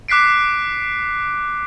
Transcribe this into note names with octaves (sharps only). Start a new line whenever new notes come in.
D6 F#6 B6 C7 D7